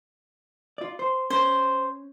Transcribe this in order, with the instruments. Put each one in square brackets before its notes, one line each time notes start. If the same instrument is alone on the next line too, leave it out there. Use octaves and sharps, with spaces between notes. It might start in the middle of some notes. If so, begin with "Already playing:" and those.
[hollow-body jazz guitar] F4 D5
C5
[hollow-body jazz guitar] C#4 [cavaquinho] C5